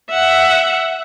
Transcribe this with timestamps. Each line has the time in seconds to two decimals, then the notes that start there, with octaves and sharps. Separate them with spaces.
0.10 E5 F#5